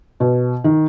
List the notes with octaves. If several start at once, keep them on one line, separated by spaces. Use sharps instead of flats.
B2
D#3